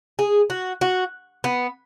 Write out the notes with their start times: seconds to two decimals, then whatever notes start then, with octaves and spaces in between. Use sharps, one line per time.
0.19 G#4
0.50 F#4
0.81 F#4
1.44 B3